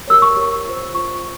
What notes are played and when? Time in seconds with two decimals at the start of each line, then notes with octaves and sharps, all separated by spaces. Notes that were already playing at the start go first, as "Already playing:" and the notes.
0.08 G4 A#4 C#5 E6
0.22 C#6
0.36 G4 A#4 C#5
0.65 F4 C5
0.94 F4 C5 C#6